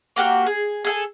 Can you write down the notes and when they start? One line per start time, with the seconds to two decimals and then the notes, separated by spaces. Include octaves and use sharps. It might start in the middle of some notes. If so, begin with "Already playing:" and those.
0.16 A#3 F#4 G4 F6
0.46 G#4
0.85 G#4 A4 G#5